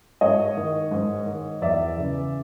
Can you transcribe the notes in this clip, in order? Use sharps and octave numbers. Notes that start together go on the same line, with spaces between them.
G#2 C#5 D#5
D#3
G#2
D#3
E2 D5 E5
C#3 E3